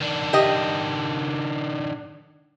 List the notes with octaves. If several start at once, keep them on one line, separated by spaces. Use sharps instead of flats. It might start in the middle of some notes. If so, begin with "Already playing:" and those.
D#3 D4
G4 D#5